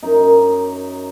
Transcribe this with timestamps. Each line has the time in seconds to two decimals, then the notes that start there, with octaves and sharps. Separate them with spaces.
0.03 F#2 D#4